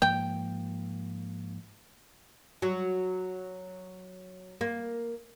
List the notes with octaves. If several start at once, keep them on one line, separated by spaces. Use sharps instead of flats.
G#2 F3 A#3 G5
F#3
A#3